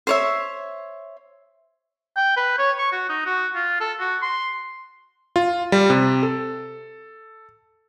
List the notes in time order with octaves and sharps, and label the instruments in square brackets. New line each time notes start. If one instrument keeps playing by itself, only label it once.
[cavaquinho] C5 C#5 E5
[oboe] G5
B4
C#5
C#6
F#4
D#4
F#4
F4
A4
F#4
C6
[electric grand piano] F4
G3
C3
A4